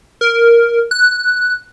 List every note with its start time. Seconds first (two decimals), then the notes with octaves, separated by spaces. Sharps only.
0.21 A#4
0.91 F#6